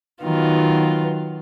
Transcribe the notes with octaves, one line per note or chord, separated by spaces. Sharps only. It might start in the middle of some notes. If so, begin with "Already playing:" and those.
D#3 F#3 B3 F4